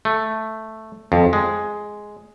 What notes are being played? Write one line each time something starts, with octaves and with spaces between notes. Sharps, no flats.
A3
F2
G#3